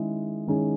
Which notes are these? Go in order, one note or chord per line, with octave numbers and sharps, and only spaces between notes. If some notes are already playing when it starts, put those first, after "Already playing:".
Already playing: D#3 G#3 C#4 E4 G#4
D#3 G#3 C#4 E4 G#4